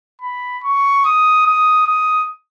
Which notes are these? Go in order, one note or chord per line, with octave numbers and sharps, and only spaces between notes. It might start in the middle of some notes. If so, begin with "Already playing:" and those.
B5
C#6
D#6
D#6
D#6